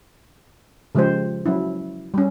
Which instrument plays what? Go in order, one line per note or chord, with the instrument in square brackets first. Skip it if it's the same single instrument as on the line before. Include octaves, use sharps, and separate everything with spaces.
[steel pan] C#3 F3 G#3 G4 C5
F#3 C#4 E4
G3 C#4